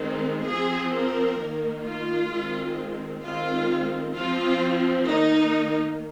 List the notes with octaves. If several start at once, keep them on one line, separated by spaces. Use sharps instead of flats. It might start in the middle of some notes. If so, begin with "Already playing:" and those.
Already playing: D#3 G#3 C4
F3 C4 G#4
A#4
D#3 A#3
F4
D#3 G#3 C4
D#3 G#3 C4 F4
F3 C4 F4
D#3 A#3 D#4